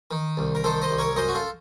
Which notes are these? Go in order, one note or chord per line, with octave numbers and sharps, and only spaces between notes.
D#3
C2
A#4
D#3 A4 C5
C5 D#5
C2
A#4 C#5
F#2 C5 D#5
F#4
F4 A4